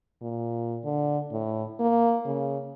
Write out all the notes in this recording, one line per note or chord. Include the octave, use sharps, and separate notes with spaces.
A#2
D3
A2
A#3
C#3